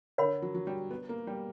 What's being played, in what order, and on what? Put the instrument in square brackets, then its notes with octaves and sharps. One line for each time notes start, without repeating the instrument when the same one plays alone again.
[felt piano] D3 [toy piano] A#4 C#5 F#5 B5
[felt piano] F#3
F#3
G3
B3
A#3
G3